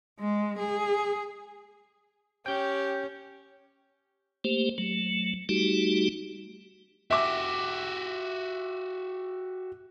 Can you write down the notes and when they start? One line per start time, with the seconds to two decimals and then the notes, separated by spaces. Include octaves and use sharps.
0.19 G#3
0.59 G#4
2.46 C#4 G4 G5 G6
4.44 A3 A#3 G4 C5
4.78 F#3 A3
5.49 G3 A3 D#4 F#4 G4
7.11 F#4 G4 E5 D6